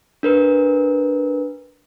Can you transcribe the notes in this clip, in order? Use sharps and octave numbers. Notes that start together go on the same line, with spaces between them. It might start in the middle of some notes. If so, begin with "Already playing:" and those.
D4 A#4 B4